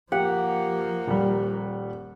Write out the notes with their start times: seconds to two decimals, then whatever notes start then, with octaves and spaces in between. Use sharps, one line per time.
0.12 F3 A#3 G4 F#5
1.07 D#1 G3